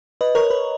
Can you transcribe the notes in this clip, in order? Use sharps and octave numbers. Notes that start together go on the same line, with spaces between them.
B4 D#5
A#4 C#5
B4